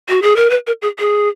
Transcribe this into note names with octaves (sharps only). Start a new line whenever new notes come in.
F#4
G#4
A#4
B4
A#4
G#4
G#4